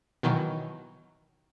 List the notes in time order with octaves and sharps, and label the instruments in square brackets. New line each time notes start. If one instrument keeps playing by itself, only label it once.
[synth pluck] B2 D#3 E3 F#3